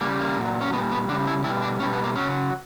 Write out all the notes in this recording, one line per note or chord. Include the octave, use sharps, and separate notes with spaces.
C#3 G3 A#3
A#3
A#2 F#3
C#4
A#2 G3 B3
B3
C#3 G3 D4
E4
B2 G3 E4
D4
B2 G3 C#4
B3
A#3
C#3 F#3 C#4